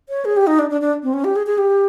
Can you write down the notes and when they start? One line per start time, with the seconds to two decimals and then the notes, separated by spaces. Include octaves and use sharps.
0.09 C#5
0.25 G#4
0.37 G4
0.47 D#4
0.59 D4
0.70 D4
0.81 D4
1.03 C4
1.13 C#4
1.24 G4
1.36 G#4
1.46 G#4
1.58 G4